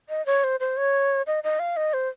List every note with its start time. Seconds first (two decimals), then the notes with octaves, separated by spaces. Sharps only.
0.09 D#5
0.26 C#5
0.44 C5
0.60 C5
0.77 C#5
1.27 D#5
1.44 D#5
1.59 F5
1.77 D#5
1.94 C5